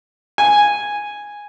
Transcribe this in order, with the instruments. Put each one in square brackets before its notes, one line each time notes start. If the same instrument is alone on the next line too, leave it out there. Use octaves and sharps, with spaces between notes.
[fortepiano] G#5